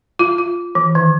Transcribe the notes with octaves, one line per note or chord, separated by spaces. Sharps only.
F4
F4
E3
D#3